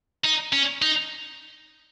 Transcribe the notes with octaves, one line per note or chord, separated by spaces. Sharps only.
D#4
C#4
D#4